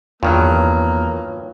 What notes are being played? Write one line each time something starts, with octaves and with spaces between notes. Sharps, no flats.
E2 G2 D#3 F#3 A#3 F4 C#5